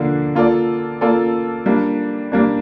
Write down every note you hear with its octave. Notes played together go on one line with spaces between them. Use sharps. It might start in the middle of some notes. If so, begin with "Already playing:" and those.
Already playing: D3 F3 A#3 D4
A#3 F4 A4 D5
A#3 F4 A4 D5
G3 A#3 D4
G3 A#3 D4